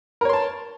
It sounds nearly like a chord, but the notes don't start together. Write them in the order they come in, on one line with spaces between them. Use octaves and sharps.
A#4 C#5 C6 A5